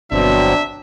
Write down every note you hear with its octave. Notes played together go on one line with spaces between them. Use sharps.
G1 B2 F#3 C4 D4 E5